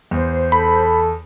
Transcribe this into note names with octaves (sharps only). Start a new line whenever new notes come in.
E2 C5
A4 B5